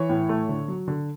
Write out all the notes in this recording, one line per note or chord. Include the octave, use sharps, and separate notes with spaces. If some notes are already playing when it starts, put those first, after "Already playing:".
Already playing: E3 C#5
A2
A3
D3
F#3
D3